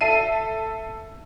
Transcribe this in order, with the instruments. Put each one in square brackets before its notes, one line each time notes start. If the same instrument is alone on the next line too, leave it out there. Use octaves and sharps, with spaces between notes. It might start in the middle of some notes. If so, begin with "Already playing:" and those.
[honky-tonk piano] A4 E5 C7 D#7